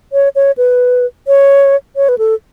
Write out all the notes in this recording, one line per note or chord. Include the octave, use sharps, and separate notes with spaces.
C#5
C#5
B4
C#5
C#5
B4
A4